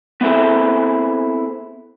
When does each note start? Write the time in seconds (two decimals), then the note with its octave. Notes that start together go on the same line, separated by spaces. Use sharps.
0.21 B3 C4 E4 G#4 A4